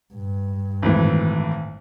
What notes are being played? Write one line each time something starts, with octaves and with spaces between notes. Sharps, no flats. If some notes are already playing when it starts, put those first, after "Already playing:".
G2
G#1 A2 E3